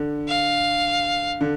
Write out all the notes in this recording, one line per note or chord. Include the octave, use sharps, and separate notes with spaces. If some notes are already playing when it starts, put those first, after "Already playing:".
Already playing: D3
F5
D3